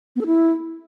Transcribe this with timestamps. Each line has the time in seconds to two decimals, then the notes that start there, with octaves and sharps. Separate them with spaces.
0.16 B3
0.21 A4
0.26 E4